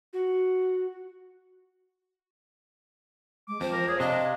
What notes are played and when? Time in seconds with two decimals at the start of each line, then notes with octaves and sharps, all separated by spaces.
0.13 F#4
3.48 G#3 D6
3.61 F2 F3 C5
3.73 A#4
3.88 G#4 C#5
4.00 C3 D4 D#5 F5